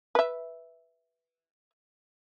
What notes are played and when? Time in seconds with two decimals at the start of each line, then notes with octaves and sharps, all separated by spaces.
0.15 B4 E5